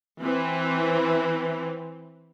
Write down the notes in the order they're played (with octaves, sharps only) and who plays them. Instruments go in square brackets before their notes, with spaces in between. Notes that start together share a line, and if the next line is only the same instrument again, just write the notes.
[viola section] E3 C4